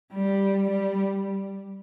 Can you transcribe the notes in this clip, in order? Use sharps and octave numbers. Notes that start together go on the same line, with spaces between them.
G3
G3